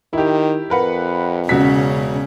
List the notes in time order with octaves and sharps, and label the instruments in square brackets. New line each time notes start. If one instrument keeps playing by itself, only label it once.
[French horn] D#3 [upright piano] E4 G4
[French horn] F2 [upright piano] A#4 B4 F#5
[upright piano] E1 F#4 B6 [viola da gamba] C#3 C#4